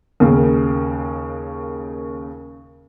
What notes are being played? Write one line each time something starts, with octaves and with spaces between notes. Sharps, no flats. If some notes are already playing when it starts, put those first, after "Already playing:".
D#2 C#3 A#3